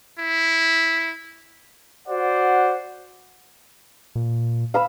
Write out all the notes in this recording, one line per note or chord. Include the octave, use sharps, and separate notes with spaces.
E4
F#4 C5 D5 F#5
A#2
F5 B5 E6